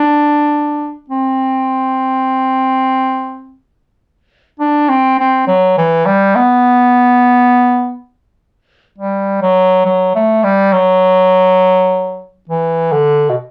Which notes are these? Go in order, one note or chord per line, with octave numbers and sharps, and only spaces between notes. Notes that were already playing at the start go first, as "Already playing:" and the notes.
Already playing: D4
C4
D4
C4
C4
F#3
E3
G3
B3
G3
F#3
F#3
A3
G3
F#3
E3
D3
B2